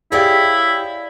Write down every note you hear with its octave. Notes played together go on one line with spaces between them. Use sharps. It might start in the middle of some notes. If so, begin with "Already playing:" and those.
E4 G4 G#4 C#5 D5 F5